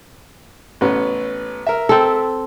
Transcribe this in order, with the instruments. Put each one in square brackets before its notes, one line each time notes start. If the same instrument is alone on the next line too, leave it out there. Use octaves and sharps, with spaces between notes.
[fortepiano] A1 B3 C#4
A#4 E5
[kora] C4 A4